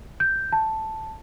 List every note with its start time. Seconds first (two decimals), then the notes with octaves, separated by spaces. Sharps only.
0.20 G6
0.52 A5